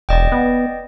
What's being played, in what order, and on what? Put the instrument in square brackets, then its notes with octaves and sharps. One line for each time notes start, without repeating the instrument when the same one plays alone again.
[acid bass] E1 [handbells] D5 D#5 G5
[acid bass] B3